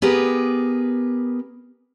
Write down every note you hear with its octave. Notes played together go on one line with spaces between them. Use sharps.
B3 G4 G#4 A#4 B4